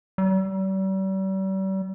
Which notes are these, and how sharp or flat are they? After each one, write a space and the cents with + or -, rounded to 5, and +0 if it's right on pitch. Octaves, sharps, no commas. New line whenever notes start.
G3 -40